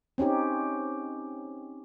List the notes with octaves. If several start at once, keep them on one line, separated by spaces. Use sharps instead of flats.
C4 C#4 D#4 G4